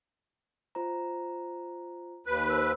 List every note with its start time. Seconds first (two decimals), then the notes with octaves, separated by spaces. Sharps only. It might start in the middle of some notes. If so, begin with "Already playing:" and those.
0.75 F4 C5 A#5
2.26 D#2 B4
2.50 C5 B5 E6